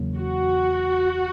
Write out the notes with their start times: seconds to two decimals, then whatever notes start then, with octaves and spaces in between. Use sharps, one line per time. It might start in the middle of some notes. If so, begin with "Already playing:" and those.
Already playing: E2 C#3 F#3 A#3
0.17 F#4